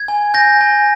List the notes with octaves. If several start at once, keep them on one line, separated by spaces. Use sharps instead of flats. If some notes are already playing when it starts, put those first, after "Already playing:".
Already playing: G#6
G#5
G#5 G6 A#6
G#5